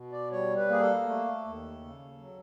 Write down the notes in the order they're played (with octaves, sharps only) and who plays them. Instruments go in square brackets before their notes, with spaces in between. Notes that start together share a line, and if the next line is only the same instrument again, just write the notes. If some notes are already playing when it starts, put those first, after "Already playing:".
Already playing: [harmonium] B2
D5
G3 C#5
B4
A#3 G#4
A4
A3
D#2
C#3
F#3